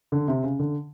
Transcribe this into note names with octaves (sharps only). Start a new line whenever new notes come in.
D3
C3
C#3
D3